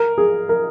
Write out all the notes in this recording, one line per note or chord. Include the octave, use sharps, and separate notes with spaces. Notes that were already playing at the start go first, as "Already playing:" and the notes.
Already playing: A#4
G#4
A#4